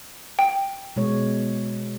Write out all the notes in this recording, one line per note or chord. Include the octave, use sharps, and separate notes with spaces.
G5
B2 G#3 C#5